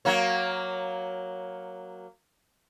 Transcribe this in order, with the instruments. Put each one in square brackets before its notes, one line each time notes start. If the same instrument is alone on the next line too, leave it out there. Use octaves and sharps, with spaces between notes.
[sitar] F#3 A#3 C#5